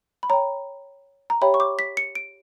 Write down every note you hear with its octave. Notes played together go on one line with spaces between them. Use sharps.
B5
C#5 G5 A#5
A#5
G4 C#5 E5 G5 B5
C#6
D6
B6
C#7
D7